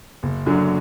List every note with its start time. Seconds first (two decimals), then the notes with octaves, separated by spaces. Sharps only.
0.23 F#1
0.46 F#2 D3 F#3